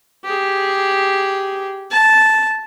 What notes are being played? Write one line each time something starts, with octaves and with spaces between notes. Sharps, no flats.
G4 G#4
A5